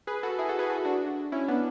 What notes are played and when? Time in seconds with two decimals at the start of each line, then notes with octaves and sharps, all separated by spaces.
0.07 G#4 B4
0.23 F#4 A4
0.38 E4 G#4
0.49 F#4 A4
0.59 G#4 B4
0.70 F#4 A4
0.85 D4 F#4
1.32 C#4 E4
1.48 B3 D4